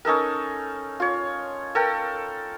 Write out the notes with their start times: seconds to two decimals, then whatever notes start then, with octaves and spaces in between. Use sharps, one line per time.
0.05 C#4 D#4 A4 A#4
1.00 F4 C#5
1.75 A4 A#4 G5